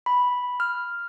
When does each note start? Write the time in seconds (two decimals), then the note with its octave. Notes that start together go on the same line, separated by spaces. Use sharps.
0.06 B5
0.60 F6